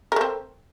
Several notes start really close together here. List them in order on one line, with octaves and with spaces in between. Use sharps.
A#4 A3 C4